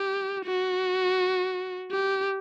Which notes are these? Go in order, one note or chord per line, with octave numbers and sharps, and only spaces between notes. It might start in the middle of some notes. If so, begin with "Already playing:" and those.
Already playing: G4
F#4
G4